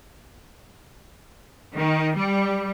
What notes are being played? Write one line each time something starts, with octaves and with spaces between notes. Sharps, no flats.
D#3
G3